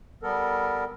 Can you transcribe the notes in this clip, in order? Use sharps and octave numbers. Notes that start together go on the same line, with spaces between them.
G3 B3 A4 A#4